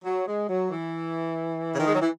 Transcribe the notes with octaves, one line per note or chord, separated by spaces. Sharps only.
F#3
G#3
F#3
E3
C#3
D#3
G#3
F#3
E3